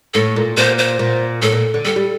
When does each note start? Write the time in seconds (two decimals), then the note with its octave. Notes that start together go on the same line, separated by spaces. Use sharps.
0.14 A2 A4
0.36 A#2
0.57 A#2 C5
0.78 C5
0.99 A#2
1.42 A2 A4
1.52 A#2
1.74 D3
1.85 G3 A4
1.96 G3